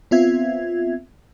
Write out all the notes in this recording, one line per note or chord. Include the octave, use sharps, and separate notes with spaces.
B3 C4 F4 E5 G#6